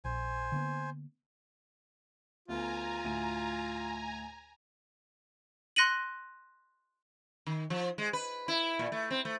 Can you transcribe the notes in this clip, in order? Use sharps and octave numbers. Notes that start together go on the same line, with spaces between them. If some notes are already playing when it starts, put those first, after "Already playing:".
A#1 C5 G#5
D3 A#3 B3
D2 A3 B3 F4 G#5 A#5
D2 A2 D#7
C6 F#6 A#6 C#7 D#7 F#7
D#3
F3
G#3
B4
E4
A#2
A3
C4
A3